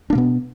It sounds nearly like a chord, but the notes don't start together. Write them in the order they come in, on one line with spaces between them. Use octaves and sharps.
D4 A#3 B2 B3